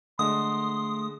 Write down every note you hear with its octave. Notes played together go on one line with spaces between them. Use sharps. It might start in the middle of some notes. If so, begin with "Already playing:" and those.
D3 G#3 A3 C6 D#6